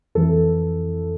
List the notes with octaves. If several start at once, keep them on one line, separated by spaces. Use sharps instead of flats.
F2 E3 A4